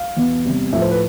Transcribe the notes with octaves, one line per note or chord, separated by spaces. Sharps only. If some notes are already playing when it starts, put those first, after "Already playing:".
Already playing: F5
E2 B2 B3
E2 C3 G3
A2 F3 A3 E5
C5
B4